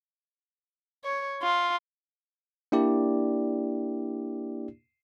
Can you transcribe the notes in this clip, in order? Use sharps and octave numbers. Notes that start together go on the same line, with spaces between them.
C#5
F4
A#3 D4 E4 G4 D5